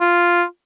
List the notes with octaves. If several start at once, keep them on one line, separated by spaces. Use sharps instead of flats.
F4